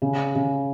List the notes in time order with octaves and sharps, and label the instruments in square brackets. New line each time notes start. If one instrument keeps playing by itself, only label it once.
[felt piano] C#3
C#3